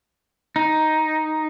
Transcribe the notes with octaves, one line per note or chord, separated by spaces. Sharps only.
D#4